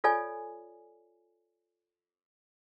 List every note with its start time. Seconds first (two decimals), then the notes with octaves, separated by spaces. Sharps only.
0.04 F4 A4 C#5 D5 G#5